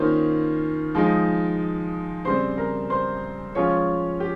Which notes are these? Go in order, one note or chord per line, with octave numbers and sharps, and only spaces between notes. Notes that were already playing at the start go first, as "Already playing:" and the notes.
Already playing: D#3 A#3 C#4 F4 C5
F3 G#3 D#4
C#3 G3 C4 C5 C6
A#4 A#5
C5 C6
F3 G#3 C#4 F4 C#5 C#6
G4